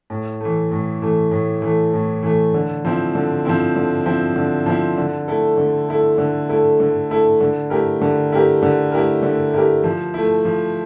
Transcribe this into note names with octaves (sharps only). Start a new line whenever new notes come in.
A2
E3 A3
A2
E3 A3
A2
E3 A3
A2
E3 A3
D3
F3 C4 E4
D3
F3 C4 E4
D3
F3 C4 E4
D3
F3 C4 E4
D3
A3 E4 A4
D3
A3 E4 A4
D3
A3 E4 A4
D3
A3 E4 A4
D3
A3 E4 G4 A#4
D3
A3 E4 G4 A#4
D3
A3 E4 G4 A#4
D3
A3 E4 G4 A#4
F3
A3 E4
F3